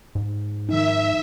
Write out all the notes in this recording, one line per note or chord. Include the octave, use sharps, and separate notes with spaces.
G#2
D#3 F3 D#4 E5